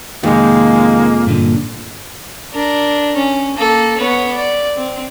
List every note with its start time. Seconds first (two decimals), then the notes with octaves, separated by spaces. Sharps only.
0.23 F2 C3 D#3 G#3 A#3
1.26 G2 A#2 D3
2.53 D4 A#4
3.16 C#4
3.57 A#3 A4
3.98 B3 C#5
4.32 D5
4.77 C4